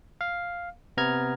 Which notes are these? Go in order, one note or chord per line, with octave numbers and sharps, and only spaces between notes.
F5
C3 B3 A#5 F6 G#6